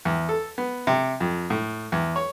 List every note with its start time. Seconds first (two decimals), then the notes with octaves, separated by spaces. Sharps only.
0.05 E2
0.29 A4
0.58 B3
0.87 C3
1.20 F2
1.50 A2
1.92 E2
2.16 C#5